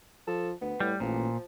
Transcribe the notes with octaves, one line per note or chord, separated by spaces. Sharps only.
F3 A4
D2 B3
A2 G3
A1 A#2 F3